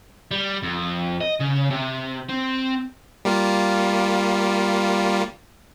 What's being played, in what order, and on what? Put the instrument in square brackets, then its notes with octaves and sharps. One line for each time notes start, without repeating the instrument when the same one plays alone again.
[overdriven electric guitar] G3
F2
D#5
C#3
C3
C4
[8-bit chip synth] G3 A#3 F4